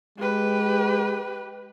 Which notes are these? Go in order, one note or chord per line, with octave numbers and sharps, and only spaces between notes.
G#3 G4 B4